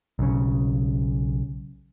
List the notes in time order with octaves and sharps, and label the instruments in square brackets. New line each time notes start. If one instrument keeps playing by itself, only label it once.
[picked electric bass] B1 C#3